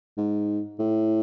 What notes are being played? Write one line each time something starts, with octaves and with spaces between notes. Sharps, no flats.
G#2
A2